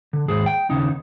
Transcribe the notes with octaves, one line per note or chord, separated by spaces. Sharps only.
D3
D#2 G#2 G#4
G5
D#2 C#3 D#4